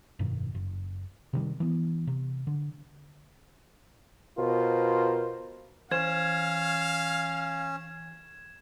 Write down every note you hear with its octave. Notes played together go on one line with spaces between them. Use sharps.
F1 G2 B2 D#3
F#1
C3 D#3 G3
E3 B3
C3
D3
B2 F4 A#4 C5
E3 C#4 C5 F5 C6 G#6 E7